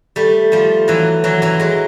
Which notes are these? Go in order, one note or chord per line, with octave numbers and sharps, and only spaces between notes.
G3 A3
F3 G3
E3 F#3
E3 F#3
E3 F#3
F#3 G#3